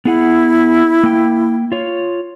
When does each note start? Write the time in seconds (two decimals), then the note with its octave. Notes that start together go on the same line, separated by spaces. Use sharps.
0.05 B3 E4 G#4 F#5
1.03 A#3 G5
1.72 F4 C#5